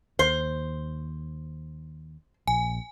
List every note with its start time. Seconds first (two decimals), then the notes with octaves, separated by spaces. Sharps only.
0.19 D#2 C5
2.48 A#1 G#5